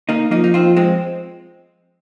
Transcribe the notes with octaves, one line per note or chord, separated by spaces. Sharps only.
A#3 D#4
F3 A#3 D#4
D#4
C4 F4
G#3 C4